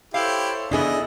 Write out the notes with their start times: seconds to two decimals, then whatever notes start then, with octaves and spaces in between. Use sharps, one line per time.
0.14 E4 G4 A4 C5 C#5 F5
0.71 C#3 E3 B3 D4 E4 G#4 A4 D#5